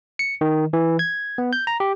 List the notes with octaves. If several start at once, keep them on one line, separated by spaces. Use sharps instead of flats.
C#7
D#3
E3
G#6
B3
G6
A#5
G4